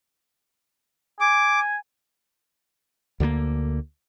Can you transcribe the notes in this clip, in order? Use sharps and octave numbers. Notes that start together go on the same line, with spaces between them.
G#5 D6
D2 D3 E3 A#3